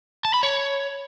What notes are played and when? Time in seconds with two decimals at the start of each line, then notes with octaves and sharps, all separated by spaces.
0.25 A5
0.34 B5
0.43 C#5